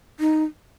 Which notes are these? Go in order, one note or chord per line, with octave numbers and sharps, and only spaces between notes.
D#4